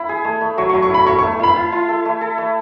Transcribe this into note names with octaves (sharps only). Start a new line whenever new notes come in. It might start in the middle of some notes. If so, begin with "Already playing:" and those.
Already playing: E4 B5
G#4
A3
A3
F#3 C#6
C#6
F#3
C#6
E4 B5
E4 C#6
A3 C#6
E4 B5
E4
E4
A4
A3
A4
A3